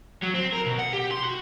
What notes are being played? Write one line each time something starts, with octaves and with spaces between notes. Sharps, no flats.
F#3
C4
A#4
B2
F#5
G4
C6
F#4